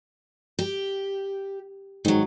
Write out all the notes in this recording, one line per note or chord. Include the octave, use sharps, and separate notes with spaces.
G4
G#2 D#3 F#3